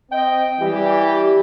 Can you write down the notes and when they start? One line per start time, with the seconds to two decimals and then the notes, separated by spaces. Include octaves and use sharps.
0.12 C4 D#5 G5
0.60 E3 G3 G4